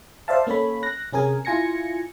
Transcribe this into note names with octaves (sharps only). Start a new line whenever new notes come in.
C5 D5 E5 F5 A5
A#3 C#4 A4 C#5 B5
F#6 A#6
C3 C#4 G#4 A#4 G#5
E4 F4 G#5 G#6 A#6 C#7